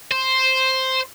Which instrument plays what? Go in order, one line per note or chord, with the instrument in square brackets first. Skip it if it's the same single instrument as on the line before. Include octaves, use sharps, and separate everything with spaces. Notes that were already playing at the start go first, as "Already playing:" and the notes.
[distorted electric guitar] C5